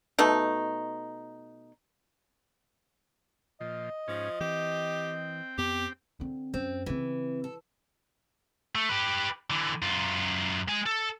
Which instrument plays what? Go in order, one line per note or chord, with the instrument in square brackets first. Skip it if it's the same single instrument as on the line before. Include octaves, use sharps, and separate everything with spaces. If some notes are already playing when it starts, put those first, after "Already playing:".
[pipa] B2 A3 D#4
[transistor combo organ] A#2 F3 [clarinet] D#5
[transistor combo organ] G#2 C#4 [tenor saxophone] F3
[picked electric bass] E3 [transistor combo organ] C4 G5 [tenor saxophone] G4
[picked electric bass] F2 B3 [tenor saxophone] G4
[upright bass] D3 C4
[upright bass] F#2 [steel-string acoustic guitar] C4
[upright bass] C#3 C4 [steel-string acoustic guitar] E3
[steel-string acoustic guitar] A4
[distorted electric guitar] A3
G4 B4
D3 E3
F#2 F4
G#3 G#5
A4